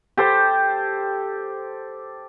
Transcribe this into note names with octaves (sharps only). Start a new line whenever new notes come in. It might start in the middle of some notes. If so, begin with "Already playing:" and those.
G4 A4 C5